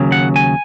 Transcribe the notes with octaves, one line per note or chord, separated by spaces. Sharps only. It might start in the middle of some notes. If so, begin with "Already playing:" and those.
Already playing: D#2 C#3 F#3
F#5
G#5